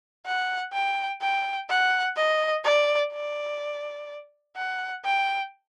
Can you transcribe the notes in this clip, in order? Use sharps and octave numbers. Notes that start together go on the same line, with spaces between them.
F#5
G5
G5
F#5
D#5
D5
D5
F#5
G5